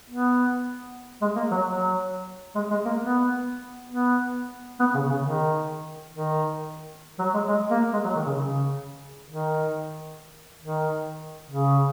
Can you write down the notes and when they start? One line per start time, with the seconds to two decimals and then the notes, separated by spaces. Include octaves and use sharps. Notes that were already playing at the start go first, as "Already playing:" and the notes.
0.10 B3
1.22 G#3
1.36 A#3
1.51 F#3
1.66 F#3
2.55 G#3
2.71 G#3
2.85 A#3
3.01 B3
3.90 B3
4.80 B3
4.94 C#3
5.10 C#3
5.24 D#3
6.14 D#3
7.19 F#3
7.34 G#3
7.48 G#3
7.70 A#3
7.93 G#3
8.05 F#3
8.16 D#3
8.26 C#3
8.38 C#3
9.27 D#3
10.62 D#3
11.51 C#3